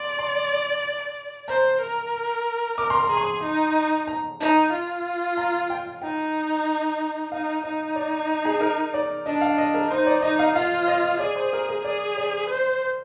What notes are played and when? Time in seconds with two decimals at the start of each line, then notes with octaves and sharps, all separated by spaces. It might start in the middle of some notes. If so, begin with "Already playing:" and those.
Already playing: D5 C6 D6
0.19 C6
1.48 C5 A#5
1.81 A#4
2.78 A#4 D6
2.90 C6
3.04 A#5
3.10 G#4
3.17 C6
3.43 D#4
4.08 A#5
4.40 D#4
4.73 F4
5.37 A#5
5.70 G5
6.02 D#4 G5
7.32 D#4 F5
7.64 D#4 D#5
7.96 D5
8.45 G#4
8.61 A#4
8.94 D5
9.26 D4 D#5
9.41 F5
9.58 D#5
9.74 A#4
9.90 D#4 C5
10.07 D5
10.22 D#4 D#5
10.39 F5
10.56 F4 F5
10.88 D#5
11.20 G#4 D5
11.36 C5
11.53 A#4
11.69 A#4
11.85 G#4 D5
12.18 D5
12.49 C5